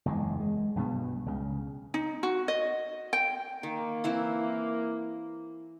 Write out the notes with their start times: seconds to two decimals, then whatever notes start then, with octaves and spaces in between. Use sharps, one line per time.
0.06 F#1 E2 D#3 G#3
0.40 G#3
0.75 B1 G2 B2 B3
1.26 C#2 C#3
1.94 D#4
2.23 F#4
2.48 D#5
3.13 G5
3.63 D#3 A#3
4.04 E3 C4 E4